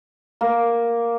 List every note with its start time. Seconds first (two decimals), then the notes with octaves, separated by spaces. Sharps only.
0.41 A#3